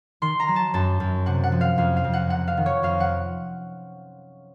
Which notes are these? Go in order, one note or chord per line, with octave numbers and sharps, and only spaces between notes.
D#3 C6
A#5
F#3
A5
F#2 A5
F#2
C3 F#5
F#5
F3
F5
F2 F5
F5
F2
F#5
C3 F#5
F5
D#3
C#5
F2 F5
F#5